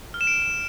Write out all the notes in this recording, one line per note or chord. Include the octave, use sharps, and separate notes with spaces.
F6
E7
D7